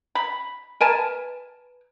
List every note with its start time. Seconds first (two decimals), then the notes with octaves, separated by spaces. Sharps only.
0.15 B5
0.81 A#4 B4 G#5 A5